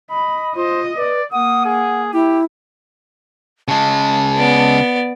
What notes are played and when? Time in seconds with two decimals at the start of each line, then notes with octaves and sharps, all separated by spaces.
0.11 D#5 B5
0.56 F4 C5 D#5
0.97 B4 D5
1.32 A#3 F#5 D#6
1.65 G#4
2.13 E4 G4
3.68 C#3 G#3 A5
4.38 B3 D5